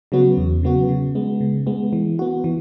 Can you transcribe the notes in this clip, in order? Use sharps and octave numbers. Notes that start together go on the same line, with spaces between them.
C#3 F#3 B3 F#4
E2
C#3 F#3 B3 F#4
C#3
G#3 B3
C#3
G#3 B3
E3
B3 F#4
E3